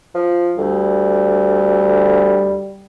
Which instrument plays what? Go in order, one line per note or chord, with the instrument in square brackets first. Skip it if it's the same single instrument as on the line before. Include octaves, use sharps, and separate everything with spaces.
[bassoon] F3
[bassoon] D2 [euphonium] G3